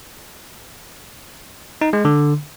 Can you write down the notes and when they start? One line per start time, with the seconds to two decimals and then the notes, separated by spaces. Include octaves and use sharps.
1.81 D#4
1.93 G#3
2.05 D3